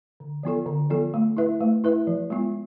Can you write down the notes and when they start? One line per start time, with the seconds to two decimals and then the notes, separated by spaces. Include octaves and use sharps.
0.20 D3
0.43 F3 B3 F4 A4
0.66 D3
0.90 F3 B3 F4 A4
1.14 A3
1.37 E4 B4 E5
1.61 A3
1.84 E4 B4 E5
2.07 F3
2.30 G#3 B3 F4